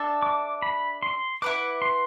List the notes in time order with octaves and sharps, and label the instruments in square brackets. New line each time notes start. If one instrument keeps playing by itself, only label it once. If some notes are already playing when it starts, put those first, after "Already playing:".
Already playing: [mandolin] D4 A4 E5 A5
[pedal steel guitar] D6
B5
C6
[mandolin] E4 B4 F#5 [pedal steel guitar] D6
[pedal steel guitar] C6